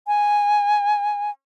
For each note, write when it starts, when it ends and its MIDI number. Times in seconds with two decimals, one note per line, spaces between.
0.07 1.31 80